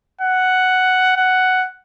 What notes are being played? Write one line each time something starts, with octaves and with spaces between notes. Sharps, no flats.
F#5
F#5